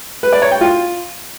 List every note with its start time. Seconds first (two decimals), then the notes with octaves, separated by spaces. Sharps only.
0.23 B4
0.33 D5
0.42 C#5
0.51 G5
0.61 F4